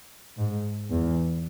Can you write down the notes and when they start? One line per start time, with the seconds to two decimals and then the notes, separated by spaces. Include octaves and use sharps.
0.37 G#2
0.90 E2